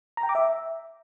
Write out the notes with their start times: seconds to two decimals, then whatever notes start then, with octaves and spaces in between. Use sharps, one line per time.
0.17 A#5
0.23 G5
0.29 D6
0.35 E5